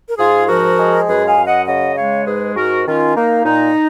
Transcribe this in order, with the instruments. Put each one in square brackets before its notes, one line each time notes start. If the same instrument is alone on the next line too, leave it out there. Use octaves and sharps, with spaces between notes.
[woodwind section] A#4
G#2 F4 G#4
F3 F#4 A#4
G#3
F#2 G#4 B4
F5 G#5
F#2
D#5 F#5
C#3 D#5 F#5
G#3 C#5 F5
G#2 G#4 B4
G#2 F#4 A#4
D#3 C#4 F4
A#3 D#4
A#2 D#4